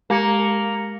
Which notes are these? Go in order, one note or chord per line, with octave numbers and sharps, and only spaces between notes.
G#3 A#3 G4 C#7